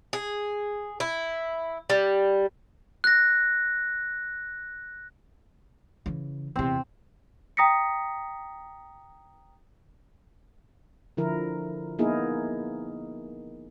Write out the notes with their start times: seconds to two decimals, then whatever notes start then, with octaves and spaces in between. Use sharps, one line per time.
0.13 G#4
1.00 E4
1.90 G3
3.04 F#6 A#6
6.06 C#3 E3
6.56 E2 C3 C4
7.57 G5 A#5 D#6 A#6 B6 C#7
11.17 D3 F3 E4 A#4
11.99 A#3 B3 D#4 E4 G#4 A#4